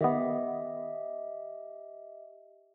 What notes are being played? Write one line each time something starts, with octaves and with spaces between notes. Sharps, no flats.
D#3 B3 G4 D#5 E5